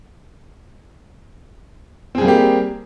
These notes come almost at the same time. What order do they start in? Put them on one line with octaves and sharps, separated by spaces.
C4 G#4 G3 A#3 G4